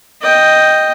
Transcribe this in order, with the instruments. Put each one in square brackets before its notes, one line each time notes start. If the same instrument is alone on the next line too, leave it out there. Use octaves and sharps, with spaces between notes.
[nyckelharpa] D#5 G5